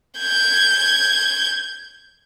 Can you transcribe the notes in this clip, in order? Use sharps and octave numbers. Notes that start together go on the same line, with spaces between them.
G6 G#6